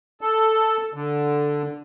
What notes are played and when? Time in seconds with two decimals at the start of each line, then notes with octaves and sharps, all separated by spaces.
0.21 A4
0.94 D3